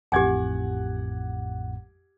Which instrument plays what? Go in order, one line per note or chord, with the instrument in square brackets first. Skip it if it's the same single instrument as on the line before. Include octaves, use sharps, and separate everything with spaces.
[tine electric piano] A1 F2 A2 [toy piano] G4 G#5 [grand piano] F#5 D6 G#6